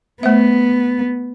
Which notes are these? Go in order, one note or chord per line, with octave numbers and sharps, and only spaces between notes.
A3 B3 C5 E5